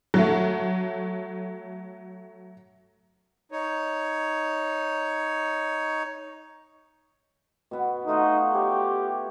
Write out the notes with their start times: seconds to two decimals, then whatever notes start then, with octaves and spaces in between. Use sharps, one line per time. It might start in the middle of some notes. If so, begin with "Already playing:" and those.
0.14 F#3 A3
3.52 D#4 C#5
7.71 B2 B3
8.07 A3 D#4 F4 F#4
8.54 G4 C#5